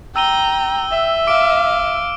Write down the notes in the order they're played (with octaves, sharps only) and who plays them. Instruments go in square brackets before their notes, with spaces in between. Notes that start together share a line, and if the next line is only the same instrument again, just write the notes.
[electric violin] G5 [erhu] A#5 [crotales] E6 D#7 G7
[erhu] E5
[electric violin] F5 [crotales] D6 D7